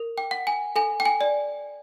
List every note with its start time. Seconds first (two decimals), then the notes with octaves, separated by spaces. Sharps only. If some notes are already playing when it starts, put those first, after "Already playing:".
Already playing: A#4
0.18 G5
0.31 F#5
0.47 G#5
0.76 A4 G#5
1.00 G5
1.05 G#5
1.21 D5